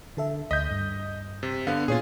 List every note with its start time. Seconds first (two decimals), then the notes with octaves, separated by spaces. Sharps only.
0.17 D3 A4 E5
0.51 D2 D#5 G6 B6
0.71 G2
1.43 C3
1.67 D3 B3 F5
1.88 A#2 F4 G#4 C#5 C7